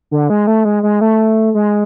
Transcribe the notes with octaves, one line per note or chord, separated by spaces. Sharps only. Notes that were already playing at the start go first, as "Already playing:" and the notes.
D3
G#3
A3
G#3
G#3
A3
G#3